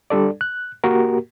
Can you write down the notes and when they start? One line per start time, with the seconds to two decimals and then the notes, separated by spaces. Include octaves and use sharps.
0.10 G3 D4 A4 D5
0.41 F#6
0.84 A#3 F#4 G4 A#4